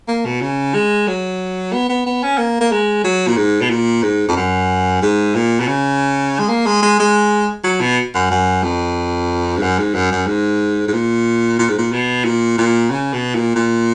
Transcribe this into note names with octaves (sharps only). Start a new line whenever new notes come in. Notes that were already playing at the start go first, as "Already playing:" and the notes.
A#3
B2
C#3
G#3
F#3
B3
B3
B3
C#4
A#3
A#3
G#3
F#3
A#2
G#2
B2
A#2
G#2
F2
F#2
G#2
A#2
B2
C#3
G#3
A#3
G#3
G#3
G#3
F#3
B2
F#2
F#2
F2
G#2
F#2
G#2
F#2
F#2
G#2
G#2
A#2
A#2
G#2
A#2
B2
A#2
A#2
C#3
B2
A#2
A#2